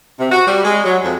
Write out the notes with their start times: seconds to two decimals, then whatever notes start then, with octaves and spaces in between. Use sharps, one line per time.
0.19 C3
0.32 F#4
0.47 G3
0.64 G#3
0.84 F#3
1.04 F2